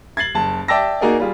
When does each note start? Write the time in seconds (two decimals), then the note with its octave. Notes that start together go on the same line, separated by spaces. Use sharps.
0.17 G#6 A6 C7 F#7
0.35 F#1 A5
0.68 D5 E5 G5 A5 E6 A#6
1.01 A#3 D#4 F#4 G#4 A#4 D5
1.20 G3 F4 G#4